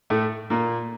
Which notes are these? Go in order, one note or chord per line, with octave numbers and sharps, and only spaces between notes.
A2 A3
A#2 A#3